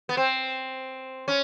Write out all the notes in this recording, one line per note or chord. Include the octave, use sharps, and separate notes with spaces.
B3
C4
C#4